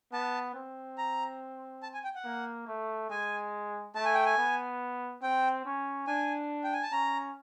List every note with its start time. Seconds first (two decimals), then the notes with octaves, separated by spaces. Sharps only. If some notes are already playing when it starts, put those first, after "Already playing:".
0.13 B3 A5
0.55 C4
0.98 A#5
1.83 A5
1.94 G#5
2.04 G5
2.15 F#5
2.25 A#3
2.67 A3
3.10 G#3 G#5
3.95 A3 A5
4.05 G#5
4.15 G5
4.25 G#5
4.38 B3
5.23 C4 G5
5.66 C#4
6.07 D4 G#5
6.64 G5
6.73 G#5
6.83 A5
6.92 C#4 A#5